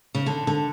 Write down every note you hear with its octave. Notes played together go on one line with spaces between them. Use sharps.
C#3
D3
D3